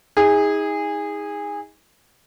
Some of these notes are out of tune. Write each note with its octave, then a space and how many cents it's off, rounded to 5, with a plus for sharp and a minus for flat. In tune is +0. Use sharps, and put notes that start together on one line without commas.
D#4 +40 G#4 -20